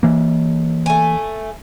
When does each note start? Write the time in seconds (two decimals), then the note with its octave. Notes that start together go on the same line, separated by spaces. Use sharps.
0.03 E3 A#3
0.86 A3 G#5